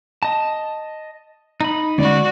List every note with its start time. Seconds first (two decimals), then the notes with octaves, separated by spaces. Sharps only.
0.23 D#5 A5
1.61 D#4 B5
1.98 D3 G#3 C#4 F#4 D5